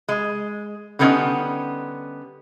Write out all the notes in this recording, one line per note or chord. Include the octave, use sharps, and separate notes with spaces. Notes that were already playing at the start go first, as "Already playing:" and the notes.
G#3
D3 G3 B3 C#4 D#4